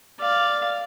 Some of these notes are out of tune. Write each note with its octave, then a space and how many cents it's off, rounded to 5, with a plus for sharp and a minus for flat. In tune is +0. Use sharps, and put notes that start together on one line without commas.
D5 +0 F5 +0